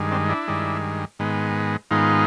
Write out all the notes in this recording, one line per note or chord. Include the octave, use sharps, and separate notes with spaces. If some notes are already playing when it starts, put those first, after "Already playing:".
Already playing: G2 D#3 G#3
C4 D4
D4 E4
G2 D#3 G#3
G#2 D#3 G#3 B3
G#2 D#3 G#3 B3 D#4 F4